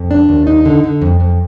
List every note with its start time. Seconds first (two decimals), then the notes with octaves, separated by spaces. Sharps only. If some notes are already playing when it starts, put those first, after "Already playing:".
Already playing: F2
0.11 D4
0.29 D#2
0.47 D#4
0.65 D3
0.84 D3
1.02 F2
1.20 F2